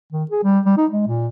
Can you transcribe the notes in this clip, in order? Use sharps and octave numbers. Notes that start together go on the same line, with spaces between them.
D#3
G#4
G3
G3
D#4
G#3
A#2